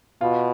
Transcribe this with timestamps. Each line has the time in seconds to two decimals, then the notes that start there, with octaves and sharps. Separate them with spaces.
0.21 B2 F4